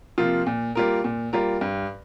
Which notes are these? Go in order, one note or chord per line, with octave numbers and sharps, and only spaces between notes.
C3 F3 A#3 F4
A#2
G3 A#3 F4 A#4
A#2
G3 A#3 F4 A#4
G2